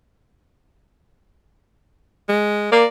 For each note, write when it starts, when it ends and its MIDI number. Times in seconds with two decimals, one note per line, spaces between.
2.29 2.69 56
2.72 2.85 58
2.72 2.87 74